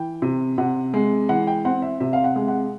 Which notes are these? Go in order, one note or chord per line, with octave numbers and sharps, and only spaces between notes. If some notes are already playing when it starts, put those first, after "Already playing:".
Already playing: E3 G5
C3
C3 F#5
G#3
E3 F#5
G5
C4 F#5
E5
C3 E5
F5
F#5
G#3
F#5